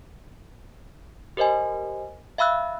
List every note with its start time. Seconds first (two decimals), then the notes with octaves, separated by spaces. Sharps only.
1.37 G4 A#4 C5 D#5 G#5
2.38 E5 F5 B5 E6 F#6